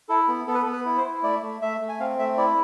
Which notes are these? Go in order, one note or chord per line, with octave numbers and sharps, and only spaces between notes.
E4 A4
B3
B3 A4
B4
A4
B3
B4
E4
C5
E4
A3 D5
A3
A3 E5
A3
G#5
C4 F5
A3 E5
E4 D5